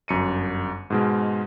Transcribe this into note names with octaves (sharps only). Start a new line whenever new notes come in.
G1 F#2 C#7 D#7
G#2 B2 G#3